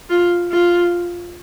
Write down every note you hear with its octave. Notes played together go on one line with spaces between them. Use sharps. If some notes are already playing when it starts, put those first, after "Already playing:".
F4
F4